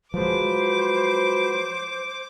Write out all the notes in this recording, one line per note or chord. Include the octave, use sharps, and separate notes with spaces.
F3 F#3 G#3 B4 C5 D6